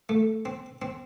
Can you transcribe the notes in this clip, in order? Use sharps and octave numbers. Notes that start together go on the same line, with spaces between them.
A3
C4
C4